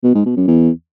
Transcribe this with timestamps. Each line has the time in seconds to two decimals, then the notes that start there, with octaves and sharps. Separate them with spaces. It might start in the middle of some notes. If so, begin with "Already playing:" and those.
0.04 B2
0.15 G#2
0.26 B2
0.37 F#2
0.48 E2